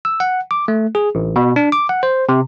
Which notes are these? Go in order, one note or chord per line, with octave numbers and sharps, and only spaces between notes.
E6
F#5
D6
A3
G#4
A1
B2
D4
D6
F#5
C5
C3